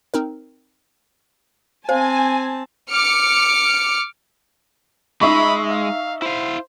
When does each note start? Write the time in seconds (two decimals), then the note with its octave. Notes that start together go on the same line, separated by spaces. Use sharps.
0.14 C4 D#4 A#4
1.89 C4 C5 F5 G#5 A5
2.90 D6 F6 C#7
5.21 G#3 D#4 E5 B5 C#6
5.71 F5
6.22 E4 C5 F5